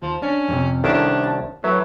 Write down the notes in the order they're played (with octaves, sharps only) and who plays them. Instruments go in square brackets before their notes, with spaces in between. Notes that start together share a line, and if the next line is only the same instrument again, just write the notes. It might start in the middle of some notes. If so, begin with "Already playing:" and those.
[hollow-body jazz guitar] D#2 [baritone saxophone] F3
[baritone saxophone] C#4 [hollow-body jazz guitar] D4
[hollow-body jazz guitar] F2 A2 C3
[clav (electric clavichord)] C2 D#3 C#4 [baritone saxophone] D4 [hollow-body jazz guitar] E4 A4 A#4
[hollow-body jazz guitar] A5
[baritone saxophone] A2 [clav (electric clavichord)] F#3 [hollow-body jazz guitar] B4 E5